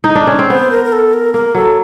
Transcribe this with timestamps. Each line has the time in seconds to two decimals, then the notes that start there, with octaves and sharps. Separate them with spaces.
0.04 D#4
0.15 D4
0.27 C#4
0.39 C4
0.50 B3 C5
0.71 A#4
0.85 A#4
0.92 A4
1.13 A#4
1.34 A#3 A#4
1.54 F#3 A4